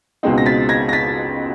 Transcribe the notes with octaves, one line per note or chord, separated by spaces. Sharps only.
C#2 B2 G#3 C4 D#4
A#6
A6 B6
G#6 A#6
A#6
A6 B6